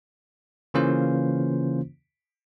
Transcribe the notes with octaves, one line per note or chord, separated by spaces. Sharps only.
C#3 E3 A#3 C#4 F4 C5